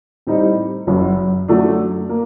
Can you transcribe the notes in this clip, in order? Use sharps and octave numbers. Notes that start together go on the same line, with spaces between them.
A2 G3 C4 D#4
F#1 F#2 F#3
F#2 F#3 A3 D4
A#3